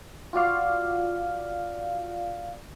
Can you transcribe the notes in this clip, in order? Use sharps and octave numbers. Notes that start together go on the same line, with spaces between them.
F4 F#4 D5 F5